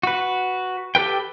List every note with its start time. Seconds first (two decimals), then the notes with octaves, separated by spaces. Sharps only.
0.03 F#4 B4
0.95 G4 A4 B4 G5